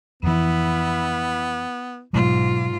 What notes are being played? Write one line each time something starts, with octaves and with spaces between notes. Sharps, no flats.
F2 E3 B3 E4
G#2 B2 F#3 F4